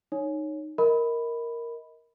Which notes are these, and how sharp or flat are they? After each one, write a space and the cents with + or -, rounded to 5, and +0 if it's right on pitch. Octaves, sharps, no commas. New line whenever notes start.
D#4 -15 C#5 +0
A#4 +0 D#5 +30 B5 +5